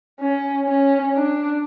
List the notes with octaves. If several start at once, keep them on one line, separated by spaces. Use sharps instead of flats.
C#4
C#4
D4